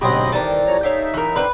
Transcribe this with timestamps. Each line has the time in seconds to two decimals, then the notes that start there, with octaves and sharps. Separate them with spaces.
0.01 D2 G#2 B2 F#3 C4 G4 D#5
0.32 D#3 E3 G3 C4 A4 A#4
0.67 F3 C#5 A#5
0.83 D#4 C#5 E5 F5 G5
1.14 E3 A#4
1.36 D3 C4 B4